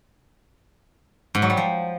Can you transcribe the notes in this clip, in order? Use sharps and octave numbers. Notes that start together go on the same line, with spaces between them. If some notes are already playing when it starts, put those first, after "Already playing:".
G#2
F#3
G3
F3